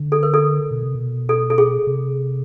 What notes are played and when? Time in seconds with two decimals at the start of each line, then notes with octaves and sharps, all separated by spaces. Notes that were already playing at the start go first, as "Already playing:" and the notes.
Already playing: D3
0.12 A4
0.23 A#4
0.34 A4
0.71 B2
0.83 C3
0.94 B2
1.29 A4
1.50 A4
1.58 G#4
1.87 C3